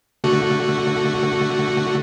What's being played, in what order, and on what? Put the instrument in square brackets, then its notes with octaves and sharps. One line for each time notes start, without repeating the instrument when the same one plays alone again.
[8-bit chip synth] D3 A3 F#4